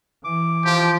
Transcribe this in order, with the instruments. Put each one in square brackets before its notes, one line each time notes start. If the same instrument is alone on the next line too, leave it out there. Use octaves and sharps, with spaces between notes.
[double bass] E3 [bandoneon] D6
[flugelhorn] F3 [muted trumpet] G4